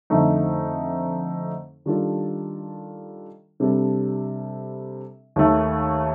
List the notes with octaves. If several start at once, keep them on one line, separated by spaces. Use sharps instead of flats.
F2 D3 A3 D#4
D#3 G3 D4 F4 A4
C3 G3 D4 A4
D#2 D#3 A3